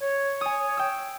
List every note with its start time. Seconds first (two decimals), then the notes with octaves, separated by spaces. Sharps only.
0.01 C#5
0.41 G#5 D#6
0.77 G5 E6